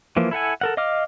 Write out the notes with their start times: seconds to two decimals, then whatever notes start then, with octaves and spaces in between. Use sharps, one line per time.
0.17 E3 F3 A#3
0.31 E4 A4 F#5 G#5
0.61 A4 A#4 F#5
0.77 D#5 F5 D6 F6